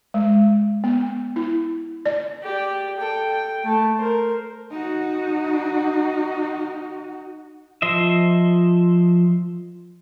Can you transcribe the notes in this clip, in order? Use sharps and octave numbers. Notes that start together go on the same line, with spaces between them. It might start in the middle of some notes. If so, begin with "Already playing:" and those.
G#3
B3
E4
D5
G4 D5
A4 G5
G5
A3 A5
A#4 C5
D#4 F#4
F3 C5 D#5 E5